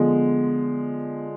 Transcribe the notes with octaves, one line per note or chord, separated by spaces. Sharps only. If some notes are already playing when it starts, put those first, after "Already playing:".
Already playing: D3 F3 G#3 B3